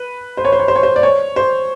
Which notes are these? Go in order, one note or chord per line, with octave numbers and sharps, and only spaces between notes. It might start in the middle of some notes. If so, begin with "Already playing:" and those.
Already playing: B4
C5
C#5
C5
C#5
C5
C#5
C5
D5
C#5
C5